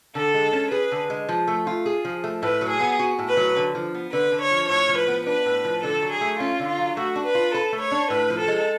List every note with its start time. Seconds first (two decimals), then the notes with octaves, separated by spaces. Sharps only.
0.15 D3 A4
0.34 G#3
0.53 C#4
0.72 G#4 B4
0.92 D3
1.10 G#3
1.29 F3
1.48 A3
1.67 F4
1.86 G#4
2.05 F3
2.24 A3
2.43 A2 B4
2.61 F#3
2.71 G#4
2.80 B3
2.99 F#4
3.19 A2
3.28 B4
3.37 F#3
3.57 D3
3.75 F3
3.94 B3
4.13 D3 B4
4.32 D3
4.42 C#5
4.51 F3
4.69 A2 C#5
4.89 F3
4.99 B4
5.08 B3
5.26 D4 B4
5.46 A2
5.65 F3
5.83 D3 A4
6.02 F#3
6.12 G#4
6.21 A3
6.40 C#4 F4
6.60 D3
6.69 F4
6.78 F#3
6.97 A3 F#4
7.16 D4
7.26 B4
7.35 F4
7.54 A4 B4
7.73 A3
7.82 C#5
7.91 D4
8.10 A2 B4
8.30 F3
8.39 A4
8.48 G#3